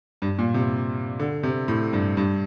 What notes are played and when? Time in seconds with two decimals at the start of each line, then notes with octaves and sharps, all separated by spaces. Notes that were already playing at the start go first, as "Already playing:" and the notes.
0.22 G2
0.39 A#2
0.54 C3
1.19 D3
1.43 C3
1.68 A2
1.93 G2
2.17 G2